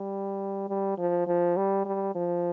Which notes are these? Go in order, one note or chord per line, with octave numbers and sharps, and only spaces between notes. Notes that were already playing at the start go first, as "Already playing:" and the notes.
Already playing: G3
G3
F3
F3
G3
G3
F3